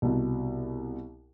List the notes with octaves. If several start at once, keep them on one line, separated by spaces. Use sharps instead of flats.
C2 B2